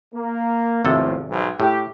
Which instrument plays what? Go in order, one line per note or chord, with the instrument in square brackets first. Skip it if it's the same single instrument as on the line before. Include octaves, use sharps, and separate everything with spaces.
[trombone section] A#3
[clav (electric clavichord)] G#1 C3 A4 [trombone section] E2 A2 F3
[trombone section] B1 G#2
[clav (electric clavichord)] A2 [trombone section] G4